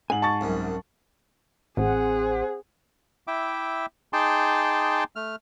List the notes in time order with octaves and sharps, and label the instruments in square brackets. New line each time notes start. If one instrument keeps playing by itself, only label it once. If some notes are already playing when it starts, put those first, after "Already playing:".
[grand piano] G#2 F#7 [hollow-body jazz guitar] G#5
[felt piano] A5 C#6 A6
[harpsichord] C2 F#2
[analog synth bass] A1 [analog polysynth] C4 C5 F#5 [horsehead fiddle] G#4
[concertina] E4 E5 G5 D6
D#4 G#4 G5 A5 C6 D6
A3 F6